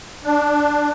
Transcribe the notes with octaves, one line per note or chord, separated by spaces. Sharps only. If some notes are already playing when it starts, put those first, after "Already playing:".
D4